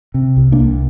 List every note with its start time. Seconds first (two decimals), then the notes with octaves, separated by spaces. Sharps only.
0.14 C3
0.37 C2
0.52 A#3 D4
0.60 C2